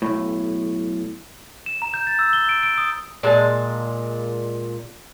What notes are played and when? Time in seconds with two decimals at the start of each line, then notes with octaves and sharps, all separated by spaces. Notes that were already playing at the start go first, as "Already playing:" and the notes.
0.02 B1 A2
1.66 E7
1.82 A#5
1.94 G6
2.07 A6
2.19 E6
2.33 G7
2.49 D7
2.63 D7
2.78 D#6
3.23 A#2 G#3 G#5 A5